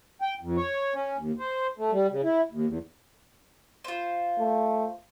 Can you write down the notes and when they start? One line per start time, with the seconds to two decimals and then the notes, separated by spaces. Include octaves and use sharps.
0.21 G5
0.41 F2
0.57 C#5
0.95 C#4
1.17 D#2
1.39 C5
1.78 A3
1.92 G3
2.10 C#3
2.24 E4
2.51 D#2
2.66 E2
3.84 F4 C5
4.39 A3